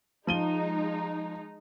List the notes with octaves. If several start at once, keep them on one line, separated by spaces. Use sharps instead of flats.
F3 G#3 D#4 D#7 G7